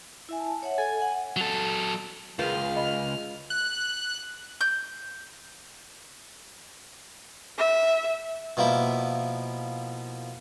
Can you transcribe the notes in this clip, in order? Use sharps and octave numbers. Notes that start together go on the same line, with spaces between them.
E4 E5 G#5
A5
C#5 E5 F#5
A4 G#5
F#5
F#3 A4
C#2 F4 G#4 A#4 B4 F6 G6
D#5 B5
F#6
G6
E5
B2 F3 A#3 E4